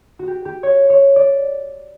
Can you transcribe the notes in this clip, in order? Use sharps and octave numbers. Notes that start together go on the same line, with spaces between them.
F#4
G4
G4
C#5
C#5
D5